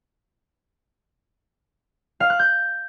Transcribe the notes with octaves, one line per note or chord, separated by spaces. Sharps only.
F5
F#6
G6